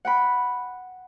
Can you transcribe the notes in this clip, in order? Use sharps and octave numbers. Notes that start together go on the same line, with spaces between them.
F#5 G5 B5